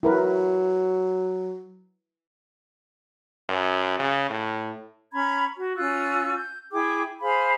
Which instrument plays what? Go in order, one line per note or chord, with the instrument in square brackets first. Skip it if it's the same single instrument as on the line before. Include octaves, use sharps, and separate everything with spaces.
[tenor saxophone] F#3 [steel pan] E4 A#4 B4
[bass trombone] F#2
C#3
A2
[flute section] C#4 A#5 B5 G#6
F#4
C#4 F4 E6 F#6
G6
E4 G#4 G5 D6
G#4 C5 F5 B5